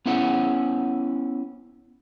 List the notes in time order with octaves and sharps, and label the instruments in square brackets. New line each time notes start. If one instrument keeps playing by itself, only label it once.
[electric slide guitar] B3 C#4 E4 B4 F#5